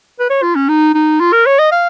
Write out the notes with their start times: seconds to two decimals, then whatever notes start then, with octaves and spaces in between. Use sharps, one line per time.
0.20 B4
0.30 C#5
0.43 F4
0.56 C#4
0.69 D#4
0.94 D#4
1.20 F4
1.33 A#4
1.46 C#5
1.59 D#5
1.72 F5